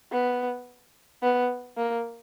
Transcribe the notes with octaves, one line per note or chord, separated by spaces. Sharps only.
B3
B3
A#3